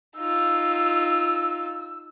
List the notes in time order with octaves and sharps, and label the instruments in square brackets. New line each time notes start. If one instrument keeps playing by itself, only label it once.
[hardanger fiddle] D#4 F4 [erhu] E6